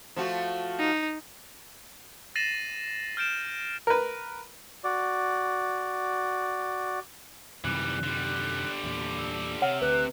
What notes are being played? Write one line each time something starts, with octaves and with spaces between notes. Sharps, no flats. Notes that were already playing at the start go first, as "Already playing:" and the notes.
F3 A3 F#4
D#4
A6 A#6 C7 D#7 E7 F#7
F6 G6 D7 E7
A#4 B4
F#4 D5
F#2 C3 D#3 E3 G3 F#6
D3 G3
E2 A#2
E6
C3 C#5 F#5 F6
D2 B4 F#6